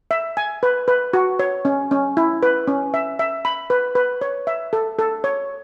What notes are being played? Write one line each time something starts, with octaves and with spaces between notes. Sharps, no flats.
E5
G#5
B4
B4
F#4
C#5
C#4
C#4
E4
B4
C#4
E5
E5
B5
B4
B4
C#5
E5
A4
A4
C#5